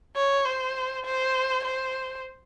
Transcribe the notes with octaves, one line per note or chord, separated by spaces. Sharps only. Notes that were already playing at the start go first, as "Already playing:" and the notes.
C#5
C5
C5
C5